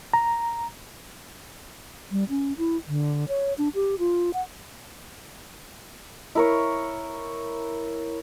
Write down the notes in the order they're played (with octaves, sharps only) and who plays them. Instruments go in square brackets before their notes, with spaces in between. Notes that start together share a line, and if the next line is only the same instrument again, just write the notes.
[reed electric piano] A#5
[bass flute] G3
C#4
E4
D3
C#5
D4
G4
F4
F#5
[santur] E4 A#4 C#5